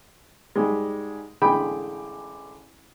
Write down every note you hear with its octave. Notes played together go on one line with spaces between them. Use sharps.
G#2 G3 G#3
A1 D3 G#3 G#4 G5 B5